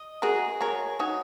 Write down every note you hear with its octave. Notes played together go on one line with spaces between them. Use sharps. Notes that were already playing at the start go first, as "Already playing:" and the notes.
Already playing: D#5
F#4 G#4 A#4
F#4 A#4 C#5
D#4 F#4 C#5